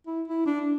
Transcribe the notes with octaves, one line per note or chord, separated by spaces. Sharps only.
E4
E4
D4